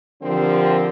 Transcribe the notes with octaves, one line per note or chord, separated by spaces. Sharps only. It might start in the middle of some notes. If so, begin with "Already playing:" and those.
D3 F3 C4 G4 A#4